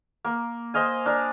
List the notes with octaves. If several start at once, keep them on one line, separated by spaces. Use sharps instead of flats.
A#3
C5 D#5 F5 G#5
D4 A#4